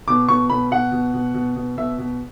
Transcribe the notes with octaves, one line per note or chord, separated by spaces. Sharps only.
B2 D6
B2 C#6
B2 B5
B2 F#5
B2
B2
B2
B2
B2 E5
B2